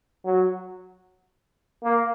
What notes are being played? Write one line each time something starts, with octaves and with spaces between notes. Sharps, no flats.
F#3
A#3